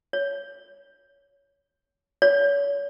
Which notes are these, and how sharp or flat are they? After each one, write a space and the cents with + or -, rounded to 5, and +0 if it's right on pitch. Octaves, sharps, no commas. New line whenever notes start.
C#5 +15
C#5 +35